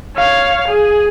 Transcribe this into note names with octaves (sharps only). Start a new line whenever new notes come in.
C#5 F5
G#4